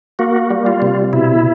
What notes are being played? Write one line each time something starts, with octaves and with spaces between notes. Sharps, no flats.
A#3 F#4
G3
F4
C3
B2 E4